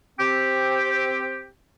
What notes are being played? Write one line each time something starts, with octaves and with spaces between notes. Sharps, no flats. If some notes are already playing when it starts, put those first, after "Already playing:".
C4 G4